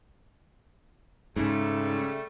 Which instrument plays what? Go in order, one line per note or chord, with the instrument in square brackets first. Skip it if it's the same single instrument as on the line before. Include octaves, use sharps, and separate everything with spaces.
[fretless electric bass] G#2 [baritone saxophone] C#3 [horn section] G3 A3